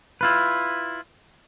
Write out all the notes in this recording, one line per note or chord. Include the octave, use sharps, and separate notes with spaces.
E4 F4 B4